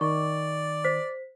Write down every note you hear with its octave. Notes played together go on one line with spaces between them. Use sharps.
D#3 D5 C#6
C5 B6